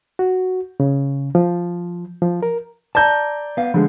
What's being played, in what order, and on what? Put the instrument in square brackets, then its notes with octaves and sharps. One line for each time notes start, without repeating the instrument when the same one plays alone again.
[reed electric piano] F#4
C#3
F3
F3
A#4
[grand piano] D5 A#5 G6 [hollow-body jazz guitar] A5
[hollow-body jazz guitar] B3 F5
[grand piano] D3 G#3 [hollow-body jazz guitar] F3